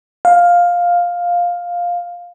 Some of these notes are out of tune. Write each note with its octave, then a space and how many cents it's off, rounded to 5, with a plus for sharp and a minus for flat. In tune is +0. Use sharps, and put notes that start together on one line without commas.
F5 +10